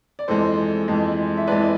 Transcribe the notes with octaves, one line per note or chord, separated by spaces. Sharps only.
D5
F2 E3 G#3 A4 C5
F2 E3 G#3
E5
F2 E3 G#3 B4 D5